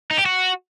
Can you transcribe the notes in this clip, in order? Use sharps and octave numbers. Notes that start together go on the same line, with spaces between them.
D#4
G4
F#4